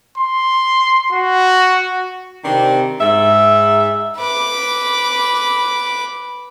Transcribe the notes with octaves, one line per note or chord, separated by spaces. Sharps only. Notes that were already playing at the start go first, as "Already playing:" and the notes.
C6
F#4
C3 D#3 C4 D4 C5
G#2 E5
B4 D6